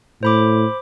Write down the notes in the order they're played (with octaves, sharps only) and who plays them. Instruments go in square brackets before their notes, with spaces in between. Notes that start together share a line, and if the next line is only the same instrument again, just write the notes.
[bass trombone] A2 [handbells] C5 B5 D6